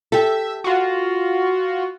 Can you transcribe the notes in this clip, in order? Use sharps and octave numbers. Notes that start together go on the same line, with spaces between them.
G4 A4 E5
F4 F#4